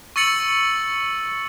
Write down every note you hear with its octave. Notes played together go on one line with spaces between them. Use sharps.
C#6 E6 A6 C#7 F#7